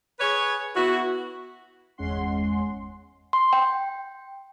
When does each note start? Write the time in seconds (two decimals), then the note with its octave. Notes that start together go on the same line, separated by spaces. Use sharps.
0.20 G#4 B4 C#5
0.76 B3 E4 F#4
1.98 G1 E2 G#3 C#4 F#5 C6
3.33 C6
3.53 G5